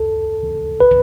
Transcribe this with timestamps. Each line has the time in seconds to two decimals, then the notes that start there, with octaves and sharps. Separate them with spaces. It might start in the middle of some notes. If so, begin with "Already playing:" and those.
Already playing: A4
0.80 B4